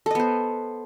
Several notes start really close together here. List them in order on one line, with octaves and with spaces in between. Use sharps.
A4 D#5 B3 C5